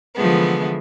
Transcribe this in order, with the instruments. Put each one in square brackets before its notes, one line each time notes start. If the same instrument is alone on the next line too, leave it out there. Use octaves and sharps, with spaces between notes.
[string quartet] D3 E3 F3 G#3 A3 B3